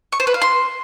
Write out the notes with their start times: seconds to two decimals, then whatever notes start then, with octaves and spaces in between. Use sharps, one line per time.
0.12 C#6
0.20 C5
0.27 B4
0.34 F5
0.42 C6